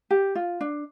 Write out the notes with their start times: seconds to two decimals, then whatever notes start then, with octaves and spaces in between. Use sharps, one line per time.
0.11 G4
0.35 F4
0.61 D4